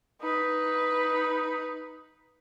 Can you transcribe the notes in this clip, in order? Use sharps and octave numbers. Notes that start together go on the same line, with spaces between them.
D#4 B4